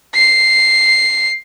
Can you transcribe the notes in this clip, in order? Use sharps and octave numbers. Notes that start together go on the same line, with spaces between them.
C7